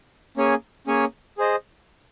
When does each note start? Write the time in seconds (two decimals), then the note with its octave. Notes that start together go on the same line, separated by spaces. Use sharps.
0.37 A#3 C#4 G#4 C#5 G#5
0.87 A#3 C#4 G#4 C#5 G#5
1.38 G#4 C5 D#5